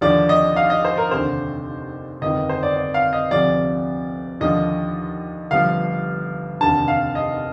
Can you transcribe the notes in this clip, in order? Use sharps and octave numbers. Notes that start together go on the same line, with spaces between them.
D#2 D3 F3 D5
D#5
F5
D#5
C5
A#4
F1 D#2 D3 C5
G1 F2 D#3 D#5
C5
D5
D5
F5
D#5
D2 C3 F3 D5
D#2 D3 F3 D#5
G1 G2 F3 F5
F1 D#2 D3 A5
F5
D#5